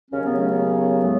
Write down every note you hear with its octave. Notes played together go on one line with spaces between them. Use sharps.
D#2 C#3 F#3 C#4
B3
A3
B3
A2 G#3